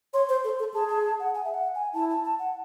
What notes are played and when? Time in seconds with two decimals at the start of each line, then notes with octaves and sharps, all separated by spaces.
0.14 C#5 C6
0.29 C5
0.44 A4
0.59 A4
0.74 G#4 A5
0.89 A5
1.04 A5
1.20 F#5
1.34 G#5
1.44 E5
1.54 F#5
1.75 G#5
1.94 E4 A5
2.10 A5
2.24 A5
2.39 F#5